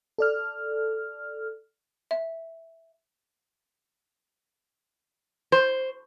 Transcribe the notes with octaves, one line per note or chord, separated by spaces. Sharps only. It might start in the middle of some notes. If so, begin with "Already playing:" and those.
A4 D5 F6
E5
C5